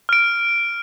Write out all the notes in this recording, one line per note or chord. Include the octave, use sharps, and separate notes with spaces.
F6 D7